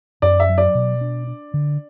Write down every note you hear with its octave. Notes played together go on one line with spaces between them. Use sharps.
F#2 D5
E5
F#3
D5
B2
D4
D4
D3